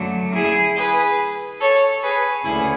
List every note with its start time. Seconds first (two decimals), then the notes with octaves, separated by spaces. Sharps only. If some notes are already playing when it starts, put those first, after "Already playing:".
Already playing: F#2 D3 F#3 A3
0.34 E4 G#4
0.76 G#4 B4
1.60 A4 C#5
2.03 G#4 B4
2.44 D2 C#3 E4 G#4